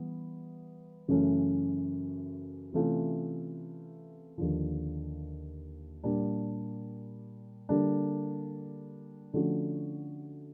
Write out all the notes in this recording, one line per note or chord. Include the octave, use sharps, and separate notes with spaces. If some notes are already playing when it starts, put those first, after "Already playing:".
Already playing: E3 G3 B3
F#2 C#3 E3 A3 C#4
C3 E3 A3 C#4 F4
D#2 D3 F3
A#2 G3 A#3 D4
D3 G3 A#3 D4
D3 F3 A3 C#4 F#4